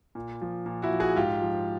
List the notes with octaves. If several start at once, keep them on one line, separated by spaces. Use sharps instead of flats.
A#2
F3
A#2
E4 F#4
F3
F#4 G#4
G#2 F4 G4
F3